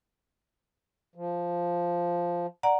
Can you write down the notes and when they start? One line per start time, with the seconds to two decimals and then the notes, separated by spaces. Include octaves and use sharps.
1.16 F3
2.63 D5 F#5 A#5